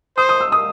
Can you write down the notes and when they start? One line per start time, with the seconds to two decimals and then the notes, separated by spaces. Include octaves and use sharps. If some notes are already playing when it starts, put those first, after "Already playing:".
0.17 C5 D#6
0.29 D#6
0.41 E6
0.52 D#6